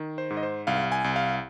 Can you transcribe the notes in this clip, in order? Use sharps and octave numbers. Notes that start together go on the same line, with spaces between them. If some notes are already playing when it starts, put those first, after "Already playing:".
Already playing: D#3
C5
G#2
D#5
C5
C2 F5
G#5
C2
F5